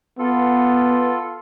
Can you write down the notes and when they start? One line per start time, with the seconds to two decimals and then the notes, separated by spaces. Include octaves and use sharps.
0.19 B3 F4 A4